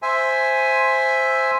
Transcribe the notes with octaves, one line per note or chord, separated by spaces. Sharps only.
C5 E5 G#5